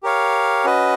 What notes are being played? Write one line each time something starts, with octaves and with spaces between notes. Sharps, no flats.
G4 A#4 C#5 F5
C#4 F#4 B4 D#5